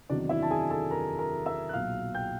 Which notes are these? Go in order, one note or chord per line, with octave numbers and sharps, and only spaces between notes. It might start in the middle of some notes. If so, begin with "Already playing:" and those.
E2 C3 D#3 F#3 D4 D5
E4 E5
A5
G#4 G#5
A4 A5
A#4 A#5
A#4 A#5
E5 E6
F#6
B1 A#2 F#3 F5 F6
G5 G6